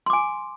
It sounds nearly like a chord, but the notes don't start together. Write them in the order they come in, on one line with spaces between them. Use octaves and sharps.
C6 D6 G#5